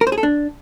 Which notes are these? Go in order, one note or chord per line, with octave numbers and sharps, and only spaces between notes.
A#4
C5
G#4
A4
D4